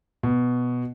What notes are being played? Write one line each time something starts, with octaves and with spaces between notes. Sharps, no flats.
B2